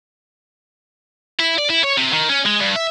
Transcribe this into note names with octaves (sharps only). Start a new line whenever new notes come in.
E4
D5
E4
C#5
C3
D#3
C#4
G#3
G2
E5